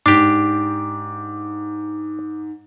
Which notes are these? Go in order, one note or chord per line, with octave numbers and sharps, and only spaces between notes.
G#2 D4 G4 D6